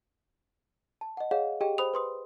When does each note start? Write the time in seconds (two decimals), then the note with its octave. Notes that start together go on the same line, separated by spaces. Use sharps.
1.01 A5
1.17 D#5 F#5
1.31 G#4 C#5 D#5 F5 F#5
1.61 G4 G#4 D#5 G5
1.78 C5 B5 D#6 F7
1.94 B4 C6 D#6